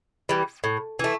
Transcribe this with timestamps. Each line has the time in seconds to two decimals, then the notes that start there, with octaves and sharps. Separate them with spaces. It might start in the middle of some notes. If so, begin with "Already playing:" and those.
0.29 E3 G3
0.64 A2
0.99 E3 A3